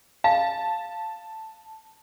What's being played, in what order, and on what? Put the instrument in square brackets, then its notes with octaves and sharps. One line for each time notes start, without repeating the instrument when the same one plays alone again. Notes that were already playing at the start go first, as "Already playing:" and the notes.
[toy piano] F5 [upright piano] A5